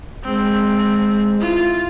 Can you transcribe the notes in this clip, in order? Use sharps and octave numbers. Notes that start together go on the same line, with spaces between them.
G#3 C4
E4 F4